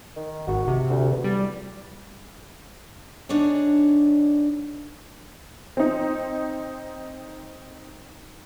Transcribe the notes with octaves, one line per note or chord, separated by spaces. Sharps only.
D#3
G#1 F#4
C3
D2
E2
G3
D3 D4 D#4 G#4 C#5
C4 D#4